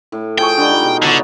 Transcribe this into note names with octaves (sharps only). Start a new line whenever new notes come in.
A2
F3 G#4 G5 C#6
D3 G3 G#3
D#4 F4
B2
D3 F#3 B3 C#5